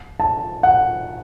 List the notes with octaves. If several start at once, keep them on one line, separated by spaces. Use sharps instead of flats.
A5
F#5